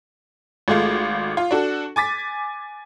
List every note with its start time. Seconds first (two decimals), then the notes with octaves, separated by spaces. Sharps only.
0.68 G#1 G#3 A3 F4
1.37 F4
1.51 D4 F#4 A4
1.96 G#5 D6 A6 B6